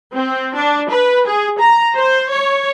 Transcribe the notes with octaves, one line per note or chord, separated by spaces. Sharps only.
C4
D4
B4
G#4
A#5
C5
C#5